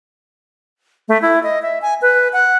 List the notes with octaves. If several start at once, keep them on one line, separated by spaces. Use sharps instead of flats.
A3
E4
D#5
E5
G#5
B4
F#5